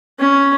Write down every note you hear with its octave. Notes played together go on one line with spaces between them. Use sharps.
C#4